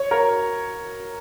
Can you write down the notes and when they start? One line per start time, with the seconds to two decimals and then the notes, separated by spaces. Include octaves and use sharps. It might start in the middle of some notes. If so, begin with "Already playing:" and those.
Already playing: C#5
0.11 A#4 C#5